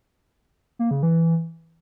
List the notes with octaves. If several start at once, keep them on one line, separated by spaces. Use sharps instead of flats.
A#3
C#3
E3